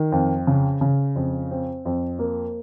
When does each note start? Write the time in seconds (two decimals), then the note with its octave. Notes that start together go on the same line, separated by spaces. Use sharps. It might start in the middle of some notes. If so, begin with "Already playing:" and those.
Already playing: D#3
0.12 F2
0.47 C#3
0.81 C#3
1.16 F2
1.51 C4
1.85 F2
2.19 A#3